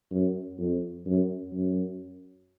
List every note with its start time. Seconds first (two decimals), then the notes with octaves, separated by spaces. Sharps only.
0.11 F#2
0.59 F2
1.06 F#2
1.53 F#2